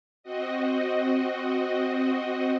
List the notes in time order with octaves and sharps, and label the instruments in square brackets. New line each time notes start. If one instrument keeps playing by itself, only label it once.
[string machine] C4 F#4 D#5